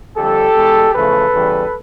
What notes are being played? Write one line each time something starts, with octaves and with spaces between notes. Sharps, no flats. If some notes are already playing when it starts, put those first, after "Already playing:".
F2 D3 G3 G4 A4
E2 B2 G#3
E2 C#3 F3 A3 A4 B4
E2 C#3 E3 G3